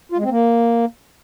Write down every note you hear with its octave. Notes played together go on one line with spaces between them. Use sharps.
F4
G#3
C4
A#3